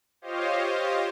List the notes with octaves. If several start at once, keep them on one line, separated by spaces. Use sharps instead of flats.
F4 G4 C5 C#5 D#5 F5